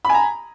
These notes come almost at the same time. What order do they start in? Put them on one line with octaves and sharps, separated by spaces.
B5 G#5 A#5